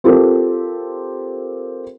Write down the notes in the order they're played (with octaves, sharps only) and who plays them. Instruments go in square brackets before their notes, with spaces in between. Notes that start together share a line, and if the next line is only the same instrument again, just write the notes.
[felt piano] C4 F4 G4 A4 A#4